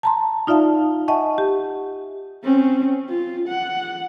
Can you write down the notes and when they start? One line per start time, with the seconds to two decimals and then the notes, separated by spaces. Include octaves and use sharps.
0.03 A5 A#5 C6
0.47 D#4 F4 D5 E5 F5 A5
1.08 D#5 E5 F#5 G#5 A5 C#6
1.38 G4
2.43 C4 C#4
3.09 F4
3.48 F#5